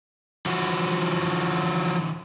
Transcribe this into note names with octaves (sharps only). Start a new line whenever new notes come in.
D3 E3 F3 F#4